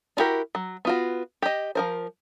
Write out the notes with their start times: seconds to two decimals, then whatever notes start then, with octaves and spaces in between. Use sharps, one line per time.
0.17 D4 E4 F#4 G4 A#4
0.55 F#3
0.85 B3 F4 F#4
1.42 G4 D#5
1.75 F3 A#4 C5